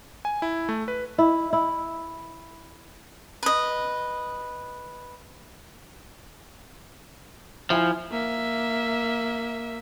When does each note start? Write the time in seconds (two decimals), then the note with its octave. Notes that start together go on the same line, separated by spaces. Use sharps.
0.25 G#5
0.42 E4
0.69 A3
0.88 B4
1.18 E4
1.53 E4
3.43 B4 D#5
7.70 F3 E4 G#5
8.11 A#3 E5